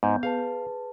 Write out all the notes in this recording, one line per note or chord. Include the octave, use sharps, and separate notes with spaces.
G#2 B3 G6
G#4 B4 F5 A5